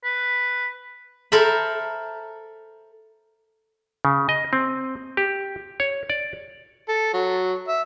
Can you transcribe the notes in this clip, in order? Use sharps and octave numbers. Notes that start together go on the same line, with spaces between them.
B4
A4 A#4 C5 E5 B5
C#3
D#5
C4
G4
C#5
D5
A4
F#3
E5